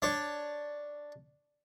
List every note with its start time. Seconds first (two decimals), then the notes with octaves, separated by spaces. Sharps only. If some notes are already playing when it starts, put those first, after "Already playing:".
0.02 D4 C#5